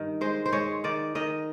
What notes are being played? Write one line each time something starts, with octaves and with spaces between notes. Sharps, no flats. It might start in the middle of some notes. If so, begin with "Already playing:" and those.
Already playing: G2 D#3
G#3 C5
C5
G#3 C#5
D#3 D5
D#3 D#5